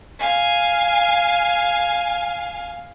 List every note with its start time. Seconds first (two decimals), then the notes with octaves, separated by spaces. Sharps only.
0.19 F5 G#5